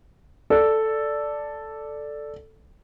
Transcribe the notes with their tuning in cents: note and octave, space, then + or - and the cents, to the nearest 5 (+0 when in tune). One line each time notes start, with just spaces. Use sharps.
A4 +0 D5 +0